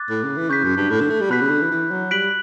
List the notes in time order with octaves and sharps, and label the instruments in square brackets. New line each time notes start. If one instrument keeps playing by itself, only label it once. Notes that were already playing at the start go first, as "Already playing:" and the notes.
Already playing: [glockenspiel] D6 F#6 A6
[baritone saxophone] A2
C#3
E3
[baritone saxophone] C#3 [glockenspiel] C#6 G6 B6
[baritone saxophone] F#2
G2
A2
D3
A3
G3
[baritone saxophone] B2 [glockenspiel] B5 F#6 B6
[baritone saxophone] C#3
D3
E3
E3
F#3
[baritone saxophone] G3 [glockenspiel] F#6 B6 D7 F#7